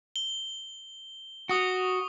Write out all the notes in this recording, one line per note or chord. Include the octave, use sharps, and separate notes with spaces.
G7
F#4 C#6 D#6 G7